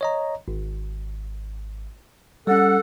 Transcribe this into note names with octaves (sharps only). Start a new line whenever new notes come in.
C#5 D#5 A#5
G#1
G3 C#4 A4 F#5